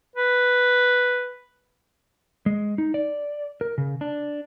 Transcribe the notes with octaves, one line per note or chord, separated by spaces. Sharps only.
B4
G#3
D#4
D5
A#4
C#3
D4